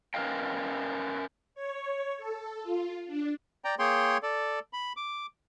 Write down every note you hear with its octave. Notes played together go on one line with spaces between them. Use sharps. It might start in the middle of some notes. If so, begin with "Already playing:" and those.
C#4 A#4 B4 D#5 F5 G5
C#5
A4
F4
D4
D5 G5 A#5
A#3 G#4 C#5 G5 C6
A4 D5
B5
D6